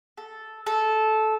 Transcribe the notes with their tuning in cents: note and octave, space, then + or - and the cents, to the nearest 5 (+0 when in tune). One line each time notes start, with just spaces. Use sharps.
A4 -5
A4 -15